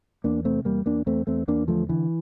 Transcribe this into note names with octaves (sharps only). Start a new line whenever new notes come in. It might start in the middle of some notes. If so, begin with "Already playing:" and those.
E2 A#3 D4
C3 A3 C4
E2 G3 A#3
E2 A#3 D4
E2 A3 C4
E2 A3 C4
E2 A#3 D4
D3 F3 A3
D3 E3